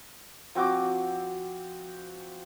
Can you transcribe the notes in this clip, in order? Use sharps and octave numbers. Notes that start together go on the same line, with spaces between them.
F3 C4 F#4 D6